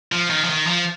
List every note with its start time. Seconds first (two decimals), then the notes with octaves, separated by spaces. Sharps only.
0.12 F3
0.30 D#3
0.44 F3
0.50 D#3
0.67 F3